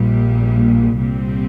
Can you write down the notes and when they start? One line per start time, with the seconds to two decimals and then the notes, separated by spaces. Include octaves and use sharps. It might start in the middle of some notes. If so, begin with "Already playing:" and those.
Already playing: A#1 A#2 G3
0.96 C2 A#2 G3 C4